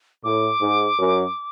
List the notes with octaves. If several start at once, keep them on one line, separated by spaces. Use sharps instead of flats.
A2 D6
G#2
F#2